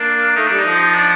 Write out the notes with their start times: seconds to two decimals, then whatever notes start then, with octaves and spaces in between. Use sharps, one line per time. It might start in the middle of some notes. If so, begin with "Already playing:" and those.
Already playing: A#3 D4
0.36 A3 D#4
0.47 G3 D4
0.59 D#4
0.66 F3
0.95 D4